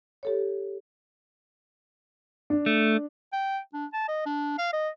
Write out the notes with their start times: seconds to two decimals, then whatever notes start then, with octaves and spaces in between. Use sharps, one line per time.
0.23 G4 A4 C#5
2.50 D4
2.66 A3
3.33 G5
3.74 D4
3.93 A5
4.09 D#5
4.26 D4
4.58 F5
4.73 D#5